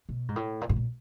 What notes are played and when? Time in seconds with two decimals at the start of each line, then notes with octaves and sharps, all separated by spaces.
0.09 B2
0.29 G#2
0.36 A2
0.61 A#2
0.69 A2
0.76 A#2